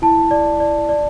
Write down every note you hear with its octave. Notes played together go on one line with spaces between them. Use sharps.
E4 A5
D5
D5
D5